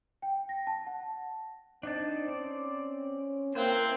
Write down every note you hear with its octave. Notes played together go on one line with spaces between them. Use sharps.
G5
A#6
A5
F#5
C4 D4 D#4 A5
C4 C#4 D5
A#3 C4 E4 B4 C5